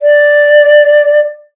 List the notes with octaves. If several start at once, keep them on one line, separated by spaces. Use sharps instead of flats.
D5